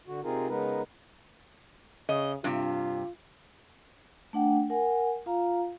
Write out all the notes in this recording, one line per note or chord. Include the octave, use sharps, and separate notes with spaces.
D3 F#4
C3 C4 D#4 F4 G#4 A#4
C#3 G#3 B3 D#4 A#4 B4
C#3 D#5
G2 C3 F4
A3 D4 F#5 G5
A#4 F#5 G#5
F4 F5 A#5